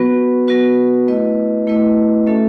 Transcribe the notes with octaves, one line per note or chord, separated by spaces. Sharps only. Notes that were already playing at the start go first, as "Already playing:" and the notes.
Already playing: F#3 B3 F#4 B4
F#3 B3 F#4 B4
A3 E4 B4 D#5
A3 E4 B4 D#5
A3 C#4 F#4 A4 E5